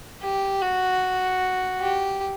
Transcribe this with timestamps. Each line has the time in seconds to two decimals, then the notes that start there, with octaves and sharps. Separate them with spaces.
0.22 G4
0.62 F#4
1.81 G4